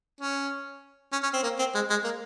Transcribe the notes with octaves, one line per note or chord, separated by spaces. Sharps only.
C#4
C#4
C#4
C4
A#3
C4
G#3
G#3
A#3